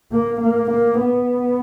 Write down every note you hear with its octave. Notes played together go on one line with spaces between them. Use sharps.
A#3
A#3
A#3
B3